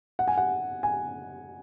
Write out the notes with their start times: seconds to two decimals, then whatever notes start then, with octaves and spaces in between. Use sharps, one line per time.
0.19 F#5
0.28 G#5
0.38 F#5
0.83 G#5